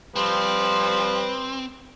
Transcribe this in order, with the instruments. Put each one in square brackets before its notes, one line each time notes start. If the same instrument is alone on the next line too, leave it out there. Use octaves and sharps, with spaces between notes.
[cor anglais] F3 [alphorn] G3 [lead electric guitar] C4 [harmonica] B4